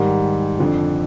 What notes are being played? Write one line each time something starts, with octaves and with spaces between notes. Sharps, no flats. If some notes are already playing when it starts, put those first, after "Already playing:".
Already playing: G#2 D#3 G3
F2 D3 F3